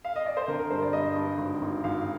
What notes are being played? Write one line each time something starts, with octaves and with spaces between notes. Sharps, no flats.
F5
D#5
D5
C5
D3 A#4
A#4
G2 C5
D5
G2 D#5
G2
G#1
G#1
G#1 F5